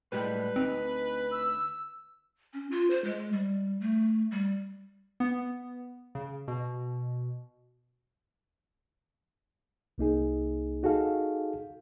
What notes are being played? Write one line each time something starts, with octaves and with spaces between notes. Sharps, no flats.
A2 G3 G#3 B4
D2 C4 D#4
E6
C#4
F4
C5
G#3
G3
A3
G3
B3
C#3
B2
C2 A#3 D#4 G#4
D#4 F#4 G#4 A4 F5